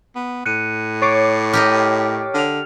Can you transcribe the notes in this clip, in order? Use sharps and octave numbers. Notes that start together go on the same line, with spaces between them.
B3
A2 F#6 C#7 D#7
C#5 D6 A6 C7 C#7
G4 A#4 D#5 F6
D3 F6 F7